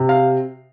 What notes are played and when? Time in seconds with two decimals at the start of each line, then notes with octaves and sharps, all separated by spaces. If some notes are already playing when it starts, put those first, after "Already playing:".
Already playing: C3
0.09 F5